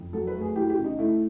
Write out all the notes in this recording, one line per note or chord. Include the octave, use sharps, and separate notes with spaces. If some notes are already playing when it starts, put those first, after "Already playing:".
Already playing: F2
F#3 A4
B4
A3
G#4
E3 G4
G4
C#3
D#4
A3 E4